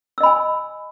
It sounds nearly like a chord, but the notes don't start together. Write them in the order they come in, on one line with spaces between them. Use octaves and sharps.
E6 D#5 B5 G#5